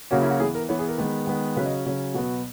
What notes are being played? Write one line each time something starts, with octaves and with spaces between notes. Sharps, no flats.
C#3 F#3 A#3 C#4 F#4
E4
F#4
E3 B3 G#4
A#4
E3 B3 C#5
G#4
A#4
D#3 G#3 B3 B4
D#3 G#3 B3
C#3 F#3 C#4 B4
D#5
C#3 F#3 C#4
B2 F#3 B3 F#4